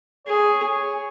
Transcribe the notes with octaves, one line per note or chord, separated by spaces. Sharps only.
G#4 C#5